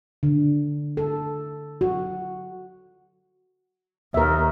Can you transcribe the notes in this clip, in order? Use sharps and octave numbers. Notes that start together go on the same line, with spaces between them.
D3
A4
F#4
D#2 A#4 E5